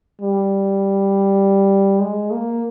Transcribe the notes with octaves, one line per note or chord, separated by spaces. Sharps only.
G3
G#3
A#3